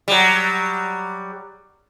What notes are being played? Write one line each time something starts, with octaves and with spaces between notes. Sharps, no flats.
F#3 G3